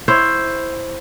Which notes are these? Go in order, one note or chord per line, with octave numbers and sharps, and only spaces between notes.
E4 C5 C#5